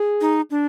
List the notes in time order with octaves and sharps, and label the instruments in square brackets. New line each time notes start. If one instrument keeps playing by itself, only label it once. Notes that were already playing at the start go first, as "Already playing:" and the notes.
Already playing: [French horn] G#4
[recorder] D#4
D4